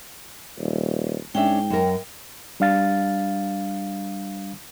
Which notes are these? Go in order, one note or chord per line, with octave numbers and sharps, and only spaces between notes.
D#1
G#2 C#4 D4 E5 G5
F#2 A#4
G3 D4 F5 A6